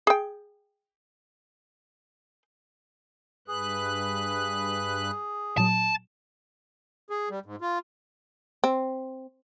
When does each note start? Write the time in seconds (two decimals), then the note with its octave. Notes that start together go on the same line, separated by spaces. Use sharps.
0.07 G#4 G5
3.48 G2 G#4 B4 F#6
5.58 A#2 F#3 A5
7.10 G#4
7.30 G3
7.46 G#2
7.61 F4
8.64 C4